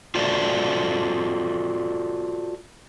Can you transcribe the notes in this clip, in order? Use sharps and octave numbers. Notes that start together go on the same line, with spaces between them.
F4 F#4 A4 C5 D5